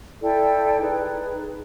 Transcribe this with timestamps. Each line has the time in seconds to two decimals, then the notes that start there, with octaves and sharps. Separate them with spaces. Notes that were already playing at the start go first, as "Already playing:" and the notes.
0.21 E4 A4 D5 G5
0.80 D#4 G#4 B4